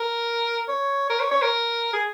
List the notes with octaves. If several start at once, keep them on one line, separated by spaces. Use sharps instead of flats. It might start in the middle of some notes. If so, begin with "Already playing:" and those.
Already playing: A#4
C#5
A#4
C#5
C#5
A#4
G#4